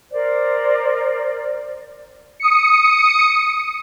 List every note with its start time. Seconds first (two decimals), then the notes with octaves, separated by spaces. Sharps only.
0.12 A#4 C5 D5
2.40 D#6 C#7